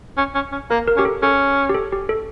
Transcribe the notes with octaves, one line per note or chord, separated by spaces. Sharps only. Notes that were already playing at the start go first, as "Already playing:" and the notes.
C#4
C#4
C#4
A#3 A#4
A#4
C#4 G4
A4
C#4 A4
G4
A4
G4
A4